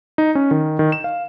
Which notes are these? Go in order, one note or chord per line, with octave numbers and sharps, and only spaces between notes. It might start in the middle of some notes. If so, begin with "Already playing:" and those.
D#4
C#4
D#3
D#3
E7
F5